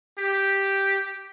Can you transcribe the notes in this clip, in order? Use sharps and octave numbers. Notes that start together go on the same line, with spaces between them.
G4